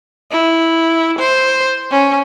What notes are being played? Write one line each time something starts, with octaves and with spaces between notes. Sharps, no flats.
E4
C5
C#4